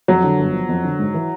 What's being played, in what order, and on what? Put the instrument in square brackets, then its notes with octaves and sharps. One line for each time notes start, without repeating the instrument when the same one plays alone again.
[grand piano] F2 [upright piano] F#3
[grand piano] D3
G1
F3
F2
D3
G#2
E3